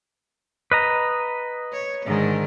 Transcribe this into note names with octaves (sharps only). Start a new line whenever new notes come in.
B4 D#5 A#5
C#5
G#2 D3 D#3